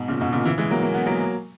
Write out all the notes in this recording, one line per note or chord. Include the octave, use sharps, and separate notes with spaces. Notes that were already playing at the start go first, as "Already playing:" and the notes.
Already playing: G#2 B2
A#2 C#3
G#2 B2
A#2 C#3
C#3 E3
E3 G#3
F#3 A#3
A#3
B3
F#3 A#3